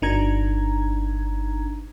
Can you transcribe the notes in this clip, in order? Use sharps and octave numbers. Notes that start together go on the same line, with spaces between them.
G1 D4 D#4 A#5 G#6